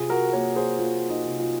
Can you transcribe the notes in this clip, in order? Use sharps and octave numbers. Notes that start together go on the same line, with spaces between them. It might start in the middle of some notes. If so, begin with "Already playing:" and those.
Already playing: C3 F4 G#4
F#4 A#4
A#3 A#4 C#5
G#4 C5
A#3 F4
D#4
C3
F4